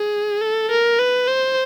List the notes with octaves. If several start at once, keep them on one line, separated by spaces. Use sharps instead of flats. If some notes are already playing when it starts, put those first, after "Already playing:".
Already playing: G#4
A4
A#4
B4
C5